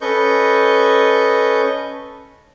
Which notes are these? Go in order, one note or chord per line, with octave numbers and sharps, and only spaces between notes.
C#4 A4 B4 D#5 C#6 G6